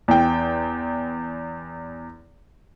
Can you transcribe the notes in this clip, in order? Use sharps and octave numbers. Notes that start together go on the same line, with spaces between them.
E2 G5